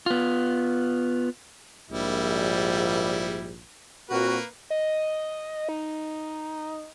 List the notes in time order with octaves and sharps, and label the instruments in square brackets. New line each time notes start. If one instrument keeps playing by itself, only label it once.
[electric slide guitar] B3 F4
[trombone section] A#1 G#2 [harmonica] G3 E4
[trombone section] A#2 C4 F#4 [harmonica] A#3 A#4 B4
[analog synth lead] D#5
D#4